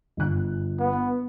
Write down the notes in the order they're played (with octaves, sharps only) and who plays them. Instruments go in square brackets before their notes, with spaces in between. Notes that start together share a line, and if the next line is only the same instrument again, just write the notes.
[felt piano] G1 F#6
[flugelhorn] B3